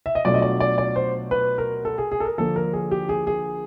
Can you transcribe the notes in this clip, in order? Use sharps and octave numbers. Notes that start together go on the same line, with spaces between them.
E5
D#5
B2 F#3 A3 D4 F4 D5
D#5
D5
D5
D5
C5
B4
A#4
A4
G#4
G#4
A4
A#4
D3 F3 A#3 D4 A4
A#4
G#4
G4
G#4
G#4